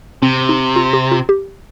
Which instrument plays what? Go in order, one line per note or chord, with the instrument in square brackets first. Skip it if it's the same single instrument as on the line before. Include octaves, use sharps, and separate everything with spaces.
[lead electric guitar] C3 [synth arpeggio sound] C4
[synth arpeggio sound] D#4
F4
G4
F4
G4